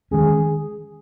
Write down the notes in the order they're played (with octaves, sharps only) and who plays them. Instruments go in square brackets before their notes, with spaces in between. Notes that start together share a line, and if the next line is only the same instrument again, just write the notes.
[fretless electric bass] D#3 G#3 C#4 [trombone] G#4